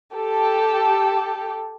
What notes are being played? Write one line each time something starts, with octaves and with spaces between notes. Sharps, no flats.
G4 A4